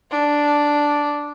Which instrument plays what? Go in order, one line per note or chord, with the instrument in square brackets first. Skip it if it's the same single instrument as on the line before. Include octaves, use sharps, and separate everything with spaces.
[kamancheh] D4